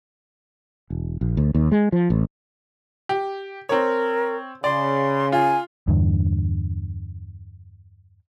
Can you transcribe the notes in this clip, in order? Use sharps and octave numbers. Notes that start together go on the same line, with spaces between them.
E1
A#1
D2
D#2
G#3
F3
A1
G4
C4 A#4 C#5
C#3 D5 C6
F4 G#5
E2 G2 D3